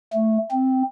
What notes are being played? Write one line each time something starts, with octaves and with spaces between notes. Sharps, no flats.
A3
C4